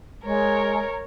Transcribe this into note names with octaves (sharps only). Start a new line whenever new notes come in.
G#3 A#4 C#5